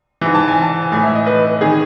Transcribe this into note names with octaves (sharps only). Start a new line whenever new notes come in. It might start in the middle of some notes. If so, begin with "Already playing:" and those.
G#2 E3
A5
G#5
A5
A2 E3 G#5
E5
D#5
B4
D#3 G#4